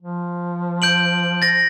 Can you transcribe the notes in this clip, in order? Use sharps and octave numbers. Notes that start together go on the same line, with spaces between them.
F3
G6 D7 F#7
A6 A#6